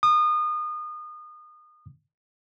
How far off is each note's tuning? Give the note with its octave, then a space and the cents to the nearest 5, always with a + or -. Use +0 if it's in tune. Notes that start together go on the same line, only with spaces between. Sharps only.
D#6 -30